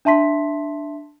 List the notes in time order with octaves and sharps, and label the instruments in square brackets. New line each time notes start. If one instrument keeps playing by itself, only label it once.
[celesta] D4 E5 A5 C6 B6